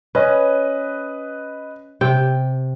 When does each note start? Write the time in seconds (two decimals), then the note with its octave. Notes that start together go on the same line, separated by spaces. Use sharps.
0.15 C#4 B4 D#5
2.01 C3 G5